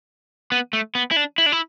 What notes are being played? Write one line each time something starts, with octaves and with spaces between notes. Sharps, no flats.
B3
A3
B3
E4
D4
E4
D4
E4